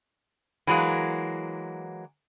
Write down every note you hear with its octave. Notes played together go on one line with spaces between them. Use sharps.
E3 F#3 G#3 A#3